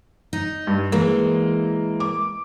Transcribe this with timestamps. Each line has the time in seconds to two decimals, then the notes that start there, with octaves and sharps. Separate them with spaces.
0.33 D#4
0.67 G2
0.92 E3 G#3 A#3
2.00 D6